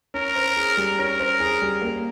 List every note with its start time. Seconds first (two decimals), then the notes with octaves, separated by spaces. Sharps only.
0.14 C#4 A#4
0.36 C5
0.57 G#4
0.77 G3
0.98 C#4 A#4
1.20 C5
1.40 G#4
1.61 G3
1.82 A#3